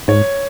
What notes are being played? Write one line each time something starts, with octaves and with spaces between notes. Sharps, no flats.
G#2 C#5